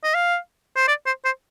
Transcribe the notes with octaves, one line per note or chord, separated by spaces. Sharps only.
D#5
F5
C5
D5
C5
C5